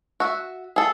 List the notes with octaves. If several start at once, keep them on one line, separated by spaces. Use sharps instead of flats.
F#4 E5
G#4 A4